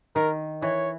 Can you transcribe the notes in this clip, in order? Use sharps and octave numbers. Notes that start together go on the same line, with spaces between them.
D#3 A#4
E3 C#5